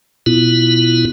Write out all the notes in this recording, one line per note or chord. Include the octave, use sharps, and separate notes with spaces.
B2 B3 E4 F4